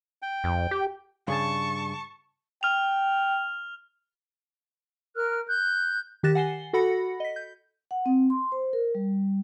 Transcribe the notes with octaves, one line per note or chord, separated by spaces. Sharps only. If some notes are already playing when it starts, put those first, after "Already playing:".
G5
F2
G4
G2 C#3 G#4 A5 C#6 A6
G5 F6 F7
A#4 F6 F#6
F#6 G6
D#3 G4 F#6 A6 A#6 E7
F#5 G#5 C7 G7
F#4 A4 F#5 B5 A#6 C#7
D#5 B6
G6
F#5
C4
C6
C5
A#4
G3